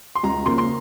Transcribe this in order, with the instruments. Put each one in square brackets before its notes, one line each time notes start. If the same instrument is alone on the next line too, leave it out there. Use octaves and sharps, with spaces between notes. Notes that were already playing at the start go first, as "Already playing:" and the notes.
[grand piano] C6
[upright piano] C#2 [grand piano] A#5
[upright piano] C#3 F3 A#3 [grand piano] C6
[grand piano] C6